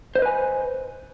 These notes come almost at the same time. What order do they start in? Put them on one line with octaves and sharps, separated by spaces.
C5 D#5 B4 G#5